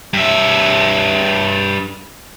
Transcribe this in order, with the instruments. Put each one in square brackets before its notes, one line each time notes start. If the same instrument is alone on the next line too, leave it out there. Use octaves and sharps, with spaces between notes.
[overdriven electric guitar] G2 E5